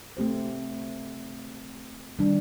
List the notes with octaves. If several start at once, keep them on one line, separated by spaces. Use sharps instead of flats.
A3 C4 G4 C5
D#3 G3 D4